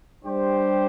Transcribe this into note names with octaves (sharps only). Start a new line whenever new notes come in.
G3 D4 G4 C5